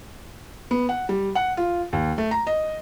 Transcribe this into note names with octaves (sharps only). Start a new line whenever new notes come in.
B3
F#5
G3
F#5
F4
D#2
A3
A#5
D#5